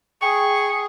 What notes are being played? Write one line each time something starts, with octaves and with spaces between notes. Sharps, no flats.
G#4 G5 C#6